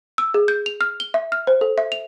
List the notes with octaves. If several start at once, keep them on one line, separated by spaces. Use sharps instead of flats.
E6
G#4
G6
F7
F6
G7
E5
F6
C5
A4
E5
F7